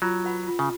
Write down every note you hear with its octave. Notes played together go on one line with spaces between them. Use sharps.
F#3 F4
B4 F#5 B5
F4
C#3